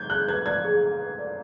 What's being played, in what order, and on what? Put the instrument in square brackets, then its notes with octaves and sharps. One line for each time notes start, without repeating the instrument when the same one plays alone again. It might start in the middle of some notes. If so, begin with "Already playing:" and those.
Already playing: [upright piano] G6 G#6
[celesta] G#4 [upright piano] F#6
[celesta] B4 [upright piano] G#6
[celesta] D5 [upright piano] G#6
[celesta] G#4
G#4
B4
D5